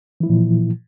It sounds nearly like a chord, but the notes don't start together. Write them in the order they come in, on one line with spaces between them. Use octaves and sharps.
E3 E4 F3 A#2